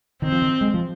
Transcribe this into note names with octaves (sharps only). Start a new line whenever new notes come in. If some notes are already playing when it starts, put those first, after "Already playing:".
D#3 C4
F3
D#3
G#3
F3